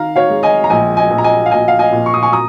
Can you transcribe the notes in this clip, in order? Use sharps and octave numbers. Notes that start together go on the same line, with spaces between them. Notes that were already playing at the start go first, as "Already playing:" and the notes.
Already playing: D#3 F5 A#5
C#5 F5
G#3
D#5 G#5
A#5
A#1 D#5 G#5
D#5 G#5
A#1
A#5
D#5 G#5
F5
A#1 D#5 G#5
F5
D#5 G#5
A#2
C#6
D#6
G#5 C#6
A#5 D#6